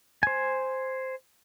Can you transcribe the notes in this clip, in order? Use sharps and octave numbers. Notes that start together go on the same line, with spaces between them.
C5 G#5